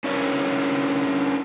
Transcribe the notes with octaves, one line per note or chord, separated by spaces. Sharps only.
C#4 D4 E4 A#4 C#5